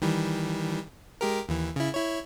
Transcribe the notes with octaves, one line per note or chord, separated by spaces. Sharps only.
D#3 E3 G3
G#3 G4 A#4
D#2 E3
C#3 E4
E4 C#5